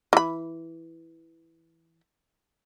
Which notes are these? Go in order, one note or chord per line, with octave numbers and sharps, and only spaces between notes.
E3 B5